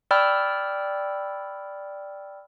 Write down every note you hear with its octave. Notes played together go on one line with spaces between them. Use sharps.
D5 G5 B5 E6 F6